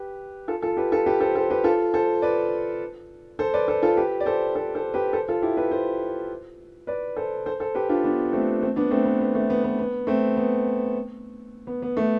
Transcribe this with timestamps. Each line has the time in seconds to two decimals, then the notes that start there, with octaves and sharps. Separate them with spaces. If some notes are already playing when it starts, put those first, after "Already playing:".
Already playing: G4 B4
0.48 F4 A4
0.62 F4 A4
0.77 G4 B4
0.92 F4 A4
1.06 G4 B4
1.20 A4 C5
1.35 A4 C5
1.50 G4 B4
1.64 F4 A4
1.94 A4 C5
2.22 B4 D5
3.39 A4 C5
3.54 B4 D5
3.68 A4 C5
3.82 F4 A4
3.97 G4 B4
4.20 D5
4.26 A4 C5
4.55 A4 C5
4.75 A4 C5
4.94 G4 B4
5.13 A4 C5
5.28 F4 A4
5.42 E4 G4
5.57 G4 B4
5.71 A4 C5
6.87 B4 D5
7.16 A4 C5
7.46 A4 C5
7.60 A4 C5
7.75 G4 B4
7.89 D4 F4
8.04 B3 D4
8.33 A3 C4
8.62 A3 C4
8.76 B3 D4
8.91 A3 C4
9.05 B3
9.20 B3
9.35 A3
9.50 B3
9.64 B3
9.79 B3
10.07 A3 C4
10.37 B3
11.67 B3
11.82 B3
11.97 A3